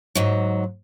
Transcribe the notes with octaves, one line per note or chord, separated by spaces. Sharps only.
G#2 F#3